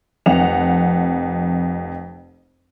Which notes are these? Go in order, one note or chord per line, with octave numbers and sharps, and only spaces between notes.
F1 F2 F#5 F7